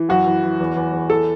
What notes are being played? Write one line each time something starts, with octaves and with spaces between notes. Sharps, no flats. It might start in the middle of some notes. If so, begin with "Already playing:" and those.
Already playing: E3
F#2 F#4
E3
E3
E2
E2
E2
E3 A4